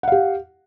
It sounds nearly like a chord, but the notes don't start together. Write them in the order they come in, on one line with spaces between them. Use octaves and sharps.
F#5 F5 G4